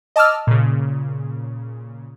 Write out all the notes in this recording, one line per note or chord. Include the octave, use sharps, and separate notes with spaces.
D#5 A5 D6 E6 F6
A#2 C#3